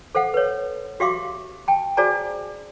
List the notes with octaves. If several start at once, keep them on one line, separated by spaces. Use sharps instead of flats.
A4 C5 F5 F#5
B4 C#5
F#4 G4 E5 F5 C6 D6
G5 A5
F#4 G#4 C5 D5 G#5 A#5